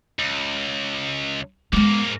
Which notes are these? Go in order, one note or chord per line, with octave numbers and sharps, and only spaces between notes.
C#2
G#2 G#3 A#3 B3